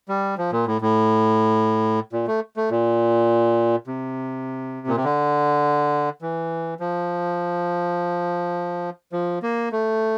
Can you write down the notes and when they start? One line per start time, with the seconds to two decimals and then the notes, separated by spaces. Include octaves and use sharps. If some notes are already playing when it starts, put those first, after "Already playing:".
0.09 G3
0.38 F3
0.52 A#2
0.66 A2
0.82 A2
2.13 A#2
2.27 A3
2.57 A3
2.71 A#2
3.87 C3
4.87 A#2
4.96 C3
5.04 D3
6.22 E3
6.80 F3
9.12 F3
9.42 A#3
9.72 A3